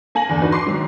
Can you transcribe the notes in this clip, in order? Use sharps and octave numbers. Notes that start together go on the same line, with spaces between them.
A#3 G#5 A#6 F#7
E2 D3
D4 D#4 F#4 B4
C6 D6 C7
G#2 D#3 F#3